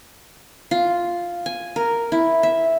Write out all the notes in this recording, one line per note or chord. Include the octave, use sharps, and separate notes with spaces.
F4
G#5
A#4
E4
E5